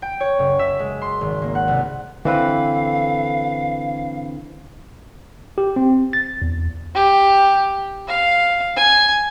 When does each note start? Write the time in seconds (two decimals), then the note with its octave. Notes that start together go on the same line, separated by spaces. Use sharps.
0.02 G5
0.20 C#5
0.39 F#1
0.59 E5
0.79 G#3
1.02 C6
1.21 G#1
1.42 A#3
1.55 F#5
1.68 C2
2.25 D3 E3 C4 B4 F5
5.58 G4
5.76 C4
6.13 A6
6.42 E2
6.95 G4
8.08 F5
8.76 G#5